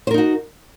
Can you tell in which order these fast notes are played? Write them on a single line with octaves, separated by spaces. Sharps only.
C5 A#4 D#4 F#4